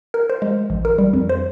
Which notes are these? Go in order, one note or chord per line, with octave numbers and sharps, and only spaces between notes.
A#4
C5
G#3
A1
A#4
G3
F2
C5